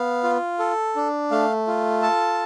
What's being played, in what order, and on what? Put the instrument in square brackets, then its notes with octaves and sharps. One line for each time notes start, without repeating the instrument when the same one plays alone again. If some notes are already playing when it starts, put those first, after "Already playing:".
Already playing: [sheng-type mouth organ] B3 F5
F4
A4
D4
A3 F5
F4
A4 A5